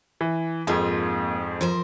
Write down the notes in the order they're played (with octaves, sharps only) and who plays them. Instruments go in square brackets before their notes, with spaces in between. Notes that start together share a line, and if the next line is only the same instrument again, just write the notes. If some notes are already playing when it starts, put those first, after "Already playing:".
[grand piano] E3
[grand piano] F2 G#2 [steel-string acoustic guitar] A#3 D#4 F4
[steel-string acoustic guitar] F3 A#4 C5